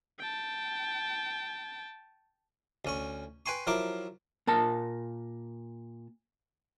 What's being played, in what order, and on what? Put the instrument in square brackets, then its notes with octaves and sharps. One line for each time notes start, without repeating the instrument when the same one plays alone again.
[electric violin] G5 A5
[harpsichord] D2 C#4 C#6
B4 G5 G#5 C6 C#6
F3 F#3 E4 A#4 D6
[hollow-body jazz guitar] A#2 A#4 A5